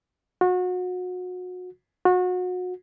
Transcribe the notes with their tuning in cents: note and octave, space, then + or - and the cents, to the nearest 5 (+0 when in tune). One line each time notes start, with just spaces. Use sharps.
F#4 -30
F#4 -30